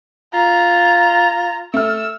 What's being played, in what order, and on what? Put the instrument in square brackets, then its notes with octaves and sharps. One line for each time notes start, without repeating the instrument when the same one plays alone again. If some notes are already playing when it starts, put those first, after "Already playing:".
[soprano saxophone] F4 [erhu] A#5
[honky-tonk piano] A3 F6 [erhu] E6